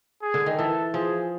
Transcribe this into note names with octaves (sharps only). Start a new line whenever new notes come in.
G#4
D3
D#3
E3 A4
F3 G#4